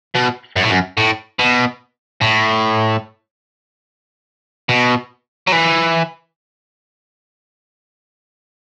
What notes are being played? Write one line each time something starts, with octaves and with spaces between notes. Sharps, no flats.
B2
F#2
A2
F#2
A2
B2
A2
B2
F#3
E3